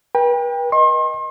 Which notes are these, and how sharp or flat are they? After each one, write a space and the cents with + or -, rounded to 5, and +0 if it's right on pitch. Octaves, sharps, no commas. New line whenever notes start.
B4 -40 G5 +25
D#5 +0 C6 +40